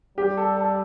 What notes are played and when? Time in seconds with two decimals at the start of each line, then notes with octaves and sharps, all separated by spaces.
0.18 G3 G4
0.37 A4
0.57 A4